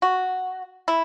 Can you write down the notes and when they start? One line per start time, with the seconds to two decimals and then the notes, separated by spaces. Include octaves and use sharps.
0.02 F#4
0.88 E4